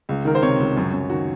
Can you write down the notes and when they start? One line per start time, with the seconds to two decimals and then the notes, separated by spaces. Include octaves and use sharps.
0.09 C#2
0.25 D#3 A#4
0.35 C5
0.43 C3 C#5
0.59 C#2
0.77 F#2
0.93 F#2
1.10 D#3 F#4